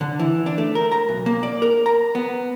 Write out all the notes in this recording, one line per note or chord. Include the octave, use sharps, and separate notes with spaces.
D3
E3
D4
A3
A#4
A#5
B1
A#3
D5
A#4
A#5
B3